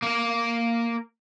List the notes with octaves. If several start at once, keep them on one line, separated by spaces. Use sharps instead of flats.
A#3 A#4